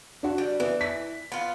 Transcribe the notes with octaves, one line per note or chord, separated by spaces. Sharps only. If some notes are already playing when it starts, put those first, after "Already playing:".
D4 F#4
G3
E3 B3
B6
B3 F4